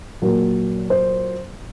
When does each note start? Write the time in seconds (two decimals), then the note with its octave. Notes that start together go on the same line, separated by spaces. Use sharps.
0.22 A#2 F#3 A#3
0.90 C5